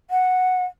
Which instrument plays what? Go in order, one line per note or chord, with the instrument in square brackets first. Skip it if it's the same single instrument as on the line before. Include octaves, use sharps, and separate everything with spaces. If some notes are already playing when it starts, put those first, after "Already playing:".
[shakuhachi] F#5